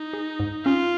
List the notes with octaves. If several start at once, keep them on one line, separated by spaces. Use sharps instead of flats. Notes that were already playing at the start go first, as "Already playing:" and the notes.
Already playing: D#4
G#4
G#2
C#4 F4